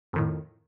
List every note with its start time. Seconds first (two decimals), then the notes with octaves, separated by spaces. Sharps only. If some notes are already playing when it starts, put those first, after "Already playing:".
0.13 F2
0.16 D#3
0.18 A2